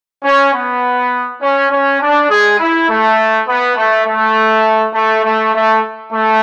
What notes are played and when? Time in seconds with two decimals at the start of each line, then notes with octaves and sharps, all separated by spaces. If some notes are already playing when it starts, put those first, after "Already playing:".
0.22 C#4
0.52 B3
1.41 C#4
1.70 C#4
2.00 D4
2.28 G#3 G#4
2.58 E4
2.88 A3
3.47 B3
3.76 A3
4.05 A3
4.93 A3
5.23 A3
5.53 A3
6.11 A3